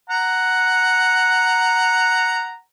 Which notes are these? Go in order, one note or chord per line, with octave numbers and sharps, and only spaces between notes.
F#5 A#5